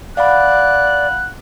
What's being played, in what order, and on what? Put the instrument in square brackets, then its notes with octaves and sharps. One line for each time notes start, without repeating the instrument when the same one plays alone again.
[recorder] D5 [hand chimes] F5 F#5 B5 [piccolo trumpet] F#6